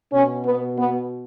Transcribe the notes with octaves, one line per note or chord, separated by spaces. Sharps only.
B2 C#4
B3
B3